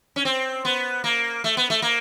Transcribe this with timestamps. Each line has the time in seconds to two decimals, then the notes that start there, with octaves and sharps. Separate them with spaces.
0.16 C#4
0.25 C4
0.65 B3
1.04 A#3
1.44 A3
1.57 B3
1.70 A3
1.82 A#3